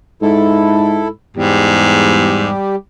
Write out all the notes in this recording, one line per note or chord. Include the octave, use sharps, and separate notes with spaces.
G#2 E4 A4
E2 G#2 G3 G4